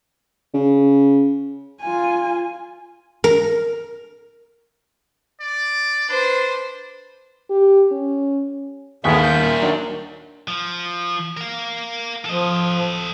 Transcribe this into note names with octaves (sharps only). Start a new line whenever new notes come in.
C#3
F4 G#5
A#4
D5
D4 B4 C5
G4
C#4
D#2 A2 B3 G#4 A#4 E5
G6
A#2
D#3 F#3 D4
F3
A#4 F5
F3 A4 D#5